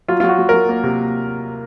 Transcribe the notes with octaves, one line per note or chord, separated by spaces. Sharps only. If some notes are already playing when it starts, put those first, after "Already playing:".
F#3 F4
F#3 F4
F#4
F#3
F#3 A#4
A#3
C3